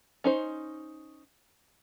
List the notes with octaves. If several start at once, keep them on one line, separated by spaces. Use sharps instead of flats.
C#4 D#4 C5